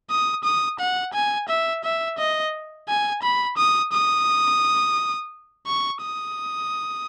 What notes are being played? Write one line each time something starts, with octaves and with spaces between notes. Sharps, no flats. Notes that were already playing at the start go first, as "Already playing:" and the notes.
D#6
D#6
F#5
G#5
E5
E5
D#5
G#5
B5
D#6
D#6
C#6
D#6